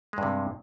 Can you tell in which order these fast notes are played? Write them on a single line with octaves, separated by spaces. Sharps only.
G#3 G2 C3